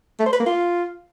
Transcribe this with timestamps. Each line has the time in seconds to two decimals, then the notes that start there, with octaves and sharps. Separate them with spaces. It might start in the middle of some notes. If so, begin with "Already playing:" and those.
0.19 A3
0.26 C5
0.33 B4
0.39 A#3
0.46 F4